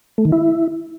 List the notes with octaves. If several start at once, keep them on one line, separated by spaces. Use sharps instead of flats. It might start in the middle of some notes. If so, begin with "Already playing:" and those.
A3
D#3
E4